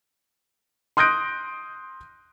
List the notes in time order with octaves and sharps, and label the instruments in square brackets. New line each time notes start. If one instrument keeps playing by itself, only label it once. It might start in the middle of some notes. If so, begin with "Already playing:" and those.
[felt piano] C6 D#6 F#6 G6 A#6 D7